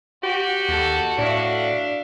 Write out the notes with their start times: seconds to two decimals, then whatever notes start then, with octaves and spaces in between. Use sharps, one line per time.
0.24 F#4 G4
0.69 D#2 A4
1.18 A2 D4 E5 F5